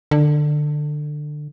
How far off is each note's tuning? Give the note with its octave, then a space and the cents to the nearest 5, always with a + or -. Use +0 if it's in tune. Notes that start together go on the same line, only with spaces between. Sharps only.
D3 +20